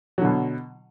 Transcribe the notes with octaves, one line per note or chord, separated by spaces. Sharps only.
B2 D3 F#3